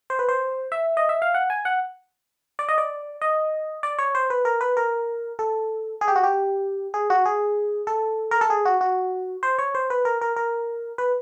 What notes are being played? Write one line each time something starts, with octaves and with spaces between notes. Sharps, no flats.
C5
B4
C5
E5
D#5
E5
F5
F#5
G#5
F#5
D5
D#5
D5
D#5
D5
C#5
C5
B4
A#4
B4
A#4
A4
G#4
G4
F#4
G4
G#4
F#4
G#4
A4
A#4
A4
G#4
F#4
F#4
C5
C#5
C5
B4
A#4
A#4
A#4
B4